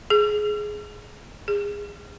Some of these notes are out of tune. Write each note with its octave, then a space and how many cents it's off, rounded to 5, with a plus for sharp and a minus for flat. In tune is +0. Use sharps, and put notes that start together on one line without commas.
G#4 +10
G#4 -30